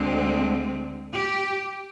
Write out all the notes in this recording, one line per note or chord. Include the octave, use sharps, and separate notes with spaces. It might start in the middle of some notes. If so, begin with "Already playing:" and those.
Already playing: D2 D3 G#3 C4
G4